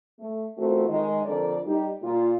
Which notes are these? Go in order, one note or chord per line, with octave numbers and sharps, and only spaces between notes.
A3
E2 A3 C4 F4 F#4 A#4
D#3 G#3 D#5
F2 D3 A#4 D5
G3 D#4 G4
A#2 F4